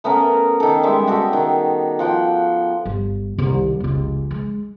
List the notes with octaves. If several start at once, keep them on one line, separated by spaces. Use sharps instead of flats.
A3 B3 C#4 A#4
D#3 A4
G3 G#3 E5
F#4 G4 A4
D#3
F3 F#5 G5
G1
C2 D#3
F1 C#2
G#3